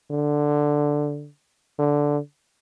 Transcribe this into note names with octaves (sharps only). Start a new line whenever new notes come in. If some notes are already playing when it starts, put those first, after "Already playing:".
D3
D3